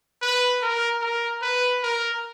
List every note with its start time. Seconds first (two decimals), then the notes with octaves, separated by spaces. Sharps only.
0.22 B4
0.62 A#4
1.01 A#4
1.42 B4
1.83 A#4